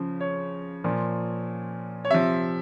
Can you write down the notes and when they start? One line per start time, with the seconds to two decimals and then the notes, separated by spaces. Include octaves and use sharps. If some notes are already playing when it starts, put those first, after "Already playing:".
Already playing: C#3 F3
0.21 C#5
0.84 A#2 F3
2.05 C#5
2.11 C3 F3 E5